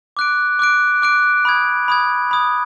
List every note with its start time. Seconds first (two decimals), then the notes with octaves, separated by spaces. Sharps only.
0.17 D6 F#6 D7
0.59 D6 F#6 D7
1.02 D6 F#6 D7
1.45 B5 D#6 G#6
1.88 B5 D#6 G#6
2.31 B5 D#6 G#6